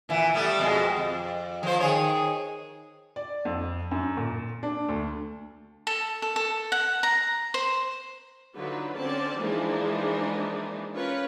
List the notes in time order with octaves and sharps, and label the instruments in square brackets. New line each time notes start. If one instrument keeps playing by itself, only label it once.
[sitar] A#2 E3
G3 A3 B3
F2 B2 G#3
F2
F3 C5
D#3 G#4 C#5
[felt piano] D5
F2
F#2
A#2
D4
D2
[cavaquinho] A4
A4
A4
F#5
A#5
C5
[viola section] D3 F#3 D#4 F4 B4
D3 C4 C#4 C5 D5 A5
E3 F3 G#3 A#3 D4 D#4
C#4 F4 A#4 B4 C#5